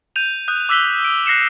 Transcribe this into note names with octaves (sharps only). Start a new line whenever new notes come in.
G6 D#7 F7
D#6 F#6 G6
D6 E6 F#6 B6 F#7 G7
D7
F#6 A#6 C7 C#7 E7